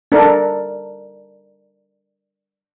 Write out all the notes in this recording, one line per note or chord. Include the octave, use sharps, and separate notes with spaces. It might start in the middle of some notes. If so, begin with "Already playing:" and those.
D4 A4 A#4